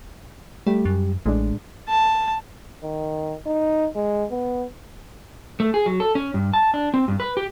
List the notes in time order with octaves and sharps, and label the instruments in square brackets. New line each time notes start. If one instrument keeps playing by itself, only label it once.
[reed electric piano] G3 G4 [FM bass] A3
[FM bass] F#2
[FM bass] A1 [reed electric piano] A2 G#3 D4
[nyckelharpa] A5
[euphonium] D#3
D#4
G#3
B3
[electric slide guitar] A3
G#4
F#3
A4
C#4
G2
A5
D4
C4
G2
B4
G4